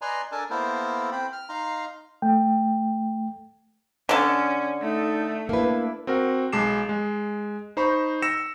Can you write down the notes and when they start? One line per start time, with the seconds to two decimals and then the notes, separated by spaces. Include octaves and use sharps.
0.02 B4 D5 D#5 G#5 A#5 C6
0.32 D4 A4 A#4 G#5 A5
0.50 A#3 B3 E4 A4 A#4 C5
1.12 C4 G5 B5
1.33 F6
1.49 D#4 F5 A#5 C6
2.22 A3 G5
4.09 D3 C#4 A5
4.82 A3 D#4 A4 D5
5.49 A#3 D4 E4 B4
6.07 C4 F#4 A#4 F#5
6.52 B1 G#3 A5 D6 C7 E7
6.89 G#3
7.77 D#4 C5 A#5 B5 C#6
8.22 E6 A#6 C#7 E7